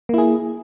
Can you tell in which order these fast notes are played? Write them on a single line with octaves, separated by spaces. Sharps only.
A#3 E4 G#4